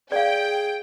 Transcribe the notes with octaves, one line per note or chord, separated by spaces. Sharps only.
G#4 D5 F5 G5